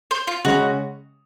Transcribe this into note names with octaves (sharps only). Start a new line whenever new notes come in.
C5
F4
C#3 G#3 C#4 F#4